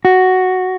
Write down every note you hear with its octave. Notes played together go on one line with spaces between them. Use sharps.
F#4